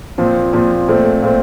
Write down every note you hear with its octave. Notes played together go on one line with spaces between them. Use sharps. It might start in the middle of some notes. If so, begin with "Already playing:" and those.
A#2 F3 C4
A#2 F3 C4
A#2 A3 C4
A#2 A3 C4